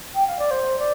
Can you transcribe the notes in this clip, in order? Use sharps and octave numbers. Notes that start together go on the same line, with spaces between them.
G5
F5
D5
C5
D5